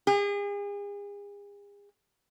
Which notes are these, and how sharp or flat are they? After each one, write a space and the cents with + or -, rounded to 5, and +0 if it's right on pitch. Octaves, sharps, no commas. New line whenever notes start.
G#4 -40